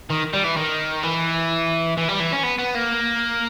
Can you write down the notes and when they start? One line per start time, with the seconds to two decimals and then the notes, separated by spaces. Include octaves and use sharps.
0.10 D#3
0.33 G3
0.44 E3
0.56 D#3
1.03 E3
1.97 E3
2.08 G3
2.20 E3
2.32 C#4
2.43 B3
2.59 B3
2.75 A#3